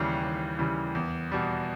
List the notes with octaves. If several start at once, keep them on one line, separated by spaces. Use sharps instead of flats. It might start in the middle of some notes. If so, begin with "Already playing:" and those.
Already playing: D#2 C#3 E3 G3
D#2
C#3 E3 G3
E2
B2 G3